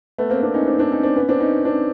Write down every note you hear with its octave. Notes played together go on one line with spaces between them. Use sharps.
A3 B3
A#3 C4
C4 D4
C#4 D#4
C4 D4
C4 D4
C#4 D#4
C4 D4
B3 C#4
C4 D4
C#4 D#4
C4 D4